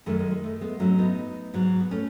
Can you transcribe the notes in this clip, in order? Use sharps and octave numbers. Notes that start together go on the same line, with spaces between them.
F#2 D#3 G#3 A3
G#3
G#3
A3
G#3 B3
G#2 F#3 A3 C#4
B3 D#4
G#2 F#3
B3
A3 C#4